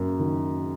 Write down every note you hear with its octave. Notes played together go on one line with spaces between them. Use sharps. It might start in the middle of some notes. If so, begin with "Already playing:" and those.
Already playing: F#2 A#3
D#3